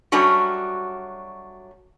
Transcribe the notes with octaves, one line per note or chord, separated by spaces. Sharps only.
F#3 G3 A3 C#4 D4 F#4